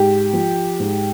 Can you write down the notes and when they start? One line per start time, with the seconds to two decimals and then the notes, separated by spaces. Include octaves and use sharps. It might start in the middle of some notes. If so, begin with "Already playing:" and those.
Already playing: G#2 G4
0.33 F3
0.80 G#2